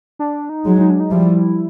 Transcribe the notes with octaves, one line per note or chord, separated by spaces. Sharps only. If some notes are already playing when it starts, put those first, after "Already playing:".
D4
D#4
F#3 G#3
D#4
D4
D#4
F3 G3 E4